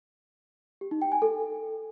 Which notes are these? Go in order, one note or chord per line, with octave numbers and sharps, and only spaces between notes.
G4
D#4
G5
G#5
A4